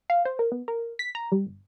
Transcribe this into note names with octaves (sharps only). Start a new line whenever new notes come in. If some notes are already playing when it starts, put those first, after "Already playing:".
F5
C5
A#4
B3
A#4
B6
A#5
G3
G1